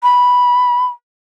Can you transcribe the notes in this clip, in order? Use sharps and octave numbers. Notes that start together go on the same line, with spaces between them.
B5